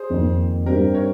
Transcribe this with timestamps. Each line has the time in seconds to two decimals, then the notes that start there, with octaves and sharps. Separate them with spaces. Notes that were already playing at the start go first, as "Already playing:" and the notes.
Already playing: G#4 C5
0.10 F2 D#3 A#3
0.66 G2 G3 C4 D#4 G4 A#4
0.94 A#4 C#5